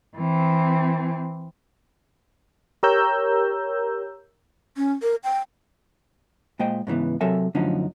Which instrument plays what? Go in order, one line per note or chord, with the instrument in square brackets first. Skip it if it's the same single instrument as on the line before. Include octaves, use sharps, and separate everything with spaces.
[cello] E3 C4
[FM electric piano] G4 A#4 C#5 A#5 E6 G6
[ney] C#4
A#4
G5
[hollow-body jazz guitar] A#2 G#3 C5 D#5 G5
G#2 C#3 E3 B3
C3 F#3 A4 A#4 E5 G#5
F#2 D3 F3 A3 C#4 D#4